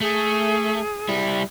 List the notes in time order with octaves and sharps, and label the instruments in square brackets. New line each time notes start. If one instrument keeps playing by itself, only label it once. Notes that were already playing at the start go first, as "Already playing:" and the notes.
[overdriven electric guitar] A3 [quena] G#4
[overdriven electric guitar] G3 E4